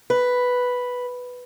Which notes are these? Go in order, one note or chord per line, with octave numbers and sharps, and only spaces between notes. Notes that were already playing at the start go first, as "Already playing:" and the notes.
B4